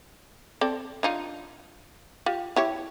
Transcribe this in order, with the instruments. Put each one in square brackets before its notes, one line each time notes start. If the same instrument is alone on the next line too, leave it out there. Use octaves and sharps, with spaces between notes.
[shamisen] C4 A4 D5
D4 D#4 F4
F4 G4
E4 G4 C#5